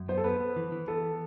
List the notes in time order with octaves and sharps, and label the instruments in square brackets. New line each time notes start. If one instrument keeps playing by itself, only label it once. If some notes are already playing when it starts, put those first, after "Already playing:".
Already playing: [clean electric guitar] F#2
[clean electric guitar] B3 [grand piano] C5
[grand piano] A4
[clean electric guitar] B3 [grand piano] B4
[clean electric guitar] B3
E3
E3
[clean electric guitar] B3 [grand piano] A4